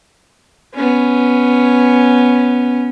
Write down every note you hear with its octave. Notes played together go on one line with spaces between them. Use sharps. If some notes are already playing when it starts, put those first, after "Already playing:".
B3 C#4